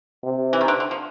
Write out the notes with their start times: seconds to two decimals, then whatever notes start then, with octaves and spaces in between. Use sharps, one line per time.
0.23 C3
0.53 E3
0.61 D#3
0.68 D3
0.80 D3
0.91 F3